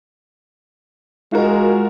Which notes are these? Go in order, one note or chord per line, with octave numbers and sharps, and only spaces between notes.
G#3 F4 F#4 A#4